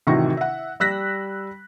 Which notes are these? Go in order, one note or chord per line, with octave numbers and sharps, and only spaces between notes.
A1 C3 D#3 F#4 C#6 A#6
E5 F#5
G3 E6 F#6 A#6 B6